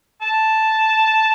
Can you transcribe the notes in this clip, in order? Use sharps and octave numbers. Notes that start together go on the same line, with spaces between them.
A5